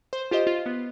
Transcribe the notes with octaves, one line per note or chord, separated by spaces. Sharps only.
C5
F4 G4 C5 D#5
F4
B3